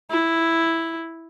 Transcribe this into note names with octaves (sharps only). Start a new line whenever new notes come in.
E4